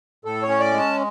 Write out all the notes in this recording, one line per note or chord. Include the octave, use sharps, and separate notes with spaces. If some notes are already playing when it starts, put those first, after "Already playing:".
A2 A4
C#5
C#4
D5
G#3
A5